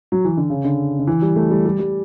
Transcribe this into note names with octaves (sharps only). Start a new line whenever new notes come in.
F#3
E3
D3
C#3
D3
D3
E3
G3
A3
G3
G3
G3